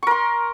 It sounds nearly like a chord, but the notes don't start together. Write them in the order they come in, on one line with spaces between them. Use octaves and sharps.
C#6 A#4 C6